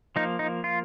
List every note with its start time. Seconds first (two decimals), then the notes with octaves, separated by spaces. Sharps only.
0.16 F3 A#3 D#4
0.39 D#4
0.64 F4